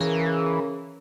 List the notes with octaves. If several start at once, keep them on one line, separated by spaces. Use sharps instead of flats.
C#3 E3 G#4 A#4 A#5